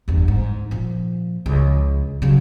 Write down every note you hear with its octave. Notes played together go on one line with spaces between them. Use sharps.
G1 E2
G#2
A#2 F3
C#2
C#3 F#3